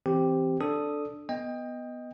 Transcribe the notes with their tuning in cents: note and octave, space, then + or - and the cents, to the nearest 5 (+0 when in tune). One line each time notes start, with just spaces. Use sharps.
E3 +0 C4 +0 G4 +0
D4 +0 A4 +0 D#6 +0
B3 +0 D#5 +0 G5 +25